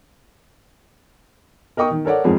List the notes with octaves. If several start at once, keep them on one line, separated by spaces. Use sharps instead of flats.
A#4 D#5 G5 C#6 D#6
D#3
A4 A#4 C#5 D5 F#5
F2 G#2 F3 G#4